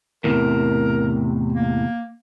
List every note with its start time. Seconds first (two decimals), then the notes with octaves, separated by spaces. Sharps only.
0.24 E2 A2 C3 A#4
1.52 A#3